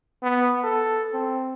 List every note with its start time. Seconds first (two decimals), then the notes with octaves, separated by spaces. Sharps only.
0.23 B3
0.64 A4
1.14 C4